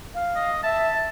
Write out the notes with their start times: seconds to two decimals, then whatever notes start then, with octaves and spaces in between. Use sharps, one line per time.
0.15 F5
0.36 D#5
0.63 E5 A5